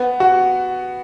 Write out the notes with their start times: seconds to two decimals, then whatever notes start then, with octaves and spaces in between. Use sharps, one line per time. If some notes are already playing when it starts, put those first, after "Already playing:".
Already playing: B3
0.20 F#4